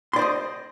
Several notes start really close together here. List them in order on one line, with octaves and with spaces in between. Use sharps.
C6 D5 C5 D#5